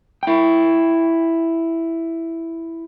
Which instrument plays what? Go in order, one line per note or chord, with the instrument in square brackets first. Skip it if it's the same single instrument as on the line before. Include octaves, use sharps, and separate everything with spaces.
[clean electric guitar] E4 G5